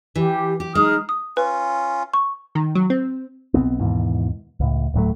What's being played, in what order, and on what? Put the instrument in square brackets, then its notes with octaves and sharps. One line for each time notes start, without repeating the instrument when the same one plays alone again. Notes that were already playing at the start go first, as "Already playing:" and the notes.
[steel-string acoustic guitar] E3 [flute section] G4
[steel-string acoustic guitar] G4
[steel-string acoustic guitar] G#3 [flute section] D#4 D#6 F6
[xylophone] D#6
[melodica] C#4 F4 [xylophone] B4
[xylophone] C#6
[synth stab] D#3
F#3
C4
[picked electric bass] B1 A2 B3 C4
D#2 G#2 B2 E3
C#2 A2
D1 A2 F#3 A3